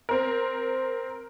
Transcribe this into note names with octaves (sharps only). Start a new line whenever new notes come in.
C4 A#4